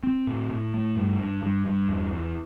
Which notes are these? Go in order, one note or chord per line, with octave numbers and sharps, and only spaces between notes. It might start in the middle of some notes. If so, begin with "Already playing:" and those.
C4
A2
A2
A3
G2
G2
G2
G2
E2
E2